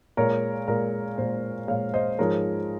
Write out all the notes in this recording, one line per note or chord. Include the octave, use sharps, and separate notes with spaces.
A#2 G#3 A#4 C#5
A#2 G#3 A#4
A#2 G#3 C5
A#2 G#3 C#5 F5
C5 D#5
G#2 F3 G#3 A#4 C#5